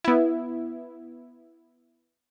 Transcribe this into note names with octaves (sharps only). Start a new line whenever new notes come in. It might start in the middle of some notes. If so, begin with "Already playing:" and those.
B3 E4